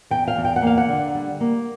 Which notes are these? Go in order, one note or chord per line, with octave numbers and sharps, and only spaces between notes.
E2 G5
F5
E2
G5
F#5
A#3 F5
F#5
D3
G3
A#3